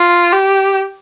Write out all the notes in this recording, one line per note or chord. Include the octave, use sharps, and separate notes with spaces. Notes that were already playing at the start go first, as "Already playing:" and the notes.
Already playing: F4
G4